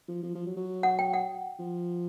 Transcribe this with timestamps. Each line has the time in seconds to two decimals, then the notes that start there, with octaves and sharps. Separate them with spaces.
0.08 F3
0.23 F3
0.35 F3
0.46 F#3
0.57 F#3
0.83 F#5
0.99 G5
1.14 F#5
1.59 F3